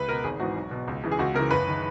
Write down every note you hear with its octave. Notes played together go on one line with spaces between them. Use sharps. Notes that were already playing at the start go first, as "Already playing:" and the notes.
Already playing: C#2 B4
B2 A#4
G#1 G#4
G#2 E3 F#4
B1
B2
C#2
C#3 E3
G#4
C#2 F#4
C#3 E3 A#4
F#1 B4
D#3